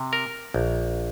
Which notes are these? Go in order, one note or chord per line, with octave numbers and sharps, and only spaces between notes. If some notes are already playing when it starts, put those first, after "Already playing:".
Already playing: C3
A#4
A#1